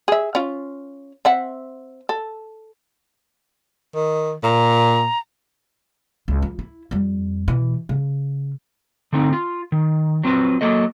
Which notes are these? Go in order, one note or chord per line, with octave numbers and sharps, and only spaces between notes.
G#4 E5
C#4 F4
C4 E5 F#5
A4
D#3
A#2 A#5
C#2
F3
E4
F2 G3
B2 E3
C#3
D3 A3 C4 D#4
F4
D#3
F#3 C4 F4 B4
F#3 A#3 A4 D#5